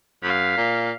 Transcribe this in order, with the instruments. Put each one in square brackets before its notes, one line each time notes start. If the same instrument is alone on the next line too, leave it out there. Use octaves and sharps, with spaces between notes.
[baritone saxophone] F#2 [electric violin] F5 B6
[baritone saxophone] A#2